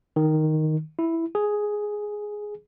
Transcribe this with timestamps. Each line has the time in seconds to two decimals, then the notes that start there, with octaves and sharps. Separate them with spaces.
0.16 D#3
0.99 E4
1.35 G#4